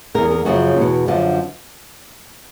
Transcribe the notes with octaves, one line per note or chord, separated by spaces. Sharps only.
E2 B2 G#4 A#4
G#4 A#4
F#2 C#3 F3 F#4 G#4
E2 B2
F#2 D3 F3